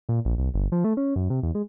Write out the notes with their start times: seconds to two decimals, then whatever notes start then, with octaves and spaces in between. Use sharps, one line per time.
0.09 A#2
0.25 A#1
0.38 C2
0.54 G1
0.72 F3
0.84 A3
0.97 C#4
1.16 F#2
1.30 C3
1.43 E2
1.55 G#3